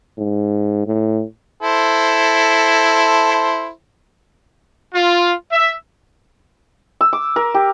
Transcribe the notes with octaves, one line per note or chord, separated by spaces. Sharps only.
G#2
A2
E4 A4 C5
F4
E5
E6
D6
A#4
G4